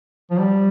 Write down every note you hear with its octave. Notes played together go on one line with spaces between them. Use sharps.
F3
G3